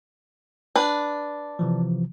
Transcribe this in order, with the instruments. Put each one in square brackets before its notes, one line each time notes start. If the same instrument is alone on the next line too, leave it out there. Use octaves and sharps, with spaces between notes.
[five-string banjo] D4 B4
[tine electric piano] C3 E3 F3